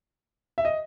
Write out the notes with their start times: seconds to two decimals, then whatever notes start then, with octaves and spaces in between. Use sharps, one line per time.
0.58 E5
0.65 D#5